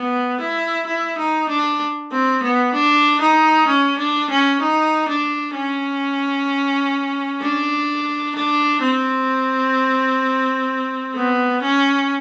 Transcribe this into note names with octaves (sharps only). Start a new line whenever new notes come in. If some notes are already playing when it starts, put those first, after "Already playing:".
Already playing: B3
E4
E4
D#4
D4
C4
B3
D4
D#4
C#4
D4
C#4
D#4
D4
C#4
D4
D4
C4
B3
C#4